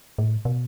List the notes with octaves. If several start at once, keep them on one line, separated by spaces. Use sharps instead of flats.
A2
B2